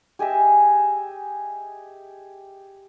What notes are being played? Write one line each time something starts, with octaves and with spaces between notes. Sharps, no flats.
G4 G#4 D#5 E5